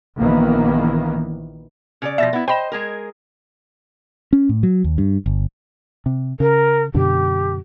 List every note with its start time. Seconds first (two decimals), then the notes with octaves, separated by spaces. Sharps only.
0.17 A#1 D#3 E3 A#3 B3
2.02 C#3 A4 D5
2.18 B2 F3 E5 A6 A#6
2.33 B3 E4
2.48 C5 D#5 G5 B5 E7
2.72 G#3 G#4 A#4
4.33 C#4
4.49 A2
4.63 F#3
4.84 D#2
4.98 G2
5.26 G1
6.06 C3
6.40 C#3 A#4
6.94 F#2 B2 D3 G4